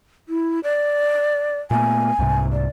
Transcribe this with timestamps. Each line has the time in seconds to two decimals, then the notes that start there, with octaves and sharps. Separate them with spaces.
0.29 E4
0.63 D5
1.71 A#2 A3 B3 G#5
2.19 C2 G#2 C3
2.52 D5